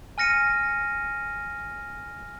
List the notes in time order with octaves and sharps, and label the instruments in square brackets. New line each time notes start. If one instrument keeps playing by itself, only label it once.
[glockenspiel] G#5 F6 A#6 C#7 D#7